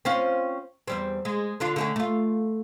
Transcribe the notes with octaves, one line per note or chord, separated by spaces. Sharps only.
C4 C#4 F4
E2 G3 C4
G#3
D3 D4 F4
D3 A3 C#4
A3 F4